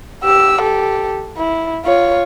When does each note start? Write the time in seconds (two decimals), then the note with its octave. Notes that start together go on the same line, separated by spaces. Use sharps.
0.24 G4 E6
0.60 G4 A4
1.38 E4
1.85 F4 C#5